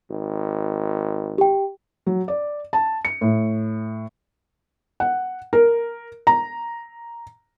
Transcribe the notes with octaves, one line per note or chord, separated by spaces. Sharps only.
G#1
G4 G5
F#3
D5
A5
C#7
A2
F#5
A#4
A#5